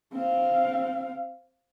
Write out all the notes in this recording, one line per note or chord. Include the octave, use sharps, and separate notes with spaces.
C4 F5